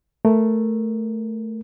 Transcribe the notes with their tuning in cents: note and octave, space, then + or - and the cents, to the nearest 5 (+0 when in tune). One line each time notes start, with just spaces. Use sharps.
A3 +0 A#4 +0